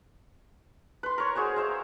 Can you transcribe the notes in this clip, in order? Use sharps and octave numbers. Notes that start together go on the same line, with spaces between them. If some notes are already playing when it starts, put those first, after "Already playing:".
B4 C6
A#4 C#5
F#4 G#4 C5 G#5
C5 E5 F5